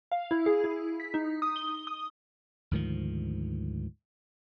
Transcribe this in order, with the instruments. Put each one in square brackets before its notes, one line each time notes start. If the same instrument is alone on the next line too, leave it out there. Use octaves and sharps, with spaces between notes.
[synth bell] F5
E4
G#4
E4
B6
D#4
D#6
G7
D#6
[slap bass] D2 G#2 D#3 F3